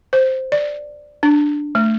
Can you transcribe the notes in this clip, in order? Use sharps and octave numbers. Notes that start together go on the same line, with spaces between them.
C5
D5
D4
A3